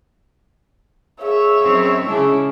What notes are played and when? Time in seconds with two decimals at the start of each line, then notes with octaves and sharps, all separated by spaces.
1.22 G#4 C#5 E5
1.61 F#2 C4 D#4
2.06 C#3 G#3 D4 E4